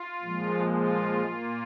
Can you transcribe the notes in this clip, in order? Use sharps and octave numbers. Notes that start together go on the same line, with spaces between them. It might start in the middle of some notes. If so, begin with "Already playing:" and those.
Already playing: F4
A#2 F3 G#3
F4
A#2 A#3